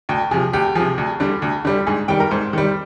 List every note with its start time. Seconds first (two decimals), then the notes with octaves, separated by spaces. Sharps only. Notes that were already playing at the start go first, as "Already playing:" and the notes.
0.09 D2 G5
0.31 C3 F3 G#4
0.53 D2 G4
0.75 C3 F3 G#4
0.98 D2
1.20 D3 G3
1.42 D2
1.65 D3 G3
1.87 G#2 G#4
2.08 D#3 G3 G5
2.20 A#4
2.31 G#2 C5
2.53 D#3 G3